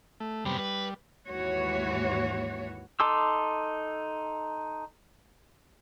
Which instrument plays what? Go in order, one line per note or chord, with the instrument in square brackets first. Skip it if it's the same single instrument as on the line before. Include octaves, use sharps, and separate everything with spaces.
[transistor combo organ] A3
[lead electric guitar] F#2 B3 [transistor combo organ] C3 G3 B5
[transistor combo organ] G3 [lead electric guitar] B4
[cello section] D#2 G#2 E3 F#4 C#5
[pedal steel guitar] D#4 A4 C6 D6 E6